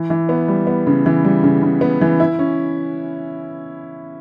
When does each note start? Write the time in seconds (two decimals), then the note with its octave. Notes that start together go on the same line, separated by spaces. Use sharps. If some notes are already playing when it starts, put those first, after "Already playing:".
Already playing: E3
0.10 E3
0.29 B3
0.48 G3
0.67 B3
0.87 C#3
1.06 E3
1.25 G3
1.44 C#3
1.63 C#3
1.81 B3
2.01 E3
2.20 E4
2.39 C#4